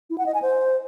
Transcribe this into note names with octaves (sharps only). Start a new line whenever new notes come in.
E4
F#5
D#5
G#5
C5